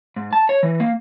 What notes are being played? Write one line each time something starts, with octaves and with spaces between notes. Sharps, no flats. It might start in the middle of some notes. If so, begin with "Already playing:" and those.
G#2
A5
C#5
E3
A#3